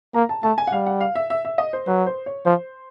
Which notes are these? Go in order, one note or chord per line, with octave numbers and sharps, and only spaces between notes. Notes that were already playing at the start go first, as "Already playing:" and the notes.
A#3 A#5
A5
A3 A5
G#5
F#5
G3 F5
F#5
F5
E5
E5
E5
D#5
C5
F#3 B4
C5
C#5
F3 C5